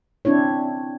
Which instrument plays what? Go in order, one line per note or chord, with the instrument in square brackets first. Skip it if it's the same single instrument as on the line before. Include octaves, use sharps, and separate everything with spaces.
[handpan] C4 D4 E4 C#5